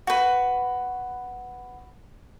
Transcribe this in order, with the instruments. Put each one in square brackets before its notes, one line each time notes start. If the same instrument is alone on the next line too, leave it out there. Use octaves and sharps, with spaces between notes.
[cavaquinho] F#4 B4